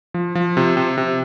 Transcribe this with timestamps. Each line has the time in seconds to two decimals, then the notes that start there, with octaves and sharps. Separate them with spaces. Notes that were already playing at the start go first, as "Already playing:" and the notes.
0.14 F3
0.35 F3
0.57 C3
0.77 C3
0.98 C3